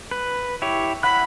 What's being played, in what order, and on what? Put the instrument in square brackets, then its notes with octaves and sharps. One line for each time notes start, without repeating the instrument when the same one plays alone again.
[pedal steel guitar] B4
E4 G4 C#5
[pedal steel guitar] E4 F#5 F#6 [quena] B5